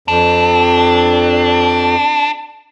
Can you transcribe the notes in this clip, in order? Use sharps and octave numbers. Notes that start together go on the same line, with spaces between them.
F2 D4